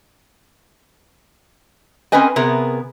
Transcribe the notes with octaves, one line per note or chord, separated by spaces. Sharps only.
C4 C#4 A#4 B4 D#5 G#5
C3 B3 G#4 A#4